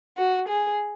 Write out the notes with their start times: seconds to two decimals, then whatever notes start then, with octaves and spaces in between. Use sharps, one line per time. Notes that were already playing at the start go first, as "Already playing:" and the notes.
0.17 F#4
0.48 G#4